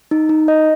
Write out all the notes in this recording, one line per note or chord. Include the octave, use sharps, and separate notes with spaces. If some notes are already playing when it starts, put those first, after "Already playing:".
D#4
D#4
D#5